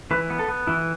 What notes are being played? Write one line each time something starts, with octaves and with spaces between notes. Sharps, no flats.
E3 B4
B3
A4
B3
E3 E4